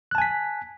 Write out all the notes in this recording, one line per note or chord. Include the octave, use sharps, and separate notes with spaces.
G#5 A5 F#6 B6